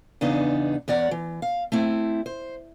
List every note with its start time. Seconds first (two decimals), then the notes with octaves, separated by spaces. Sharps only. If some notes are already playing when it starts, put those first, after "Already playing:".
0.21 E2 C#3 B3 D4 D#4
0.88 E2 C#5 D5 F#5
1.11 E3
1.42 F5
1.72 A3 C4 E4
2.26 C5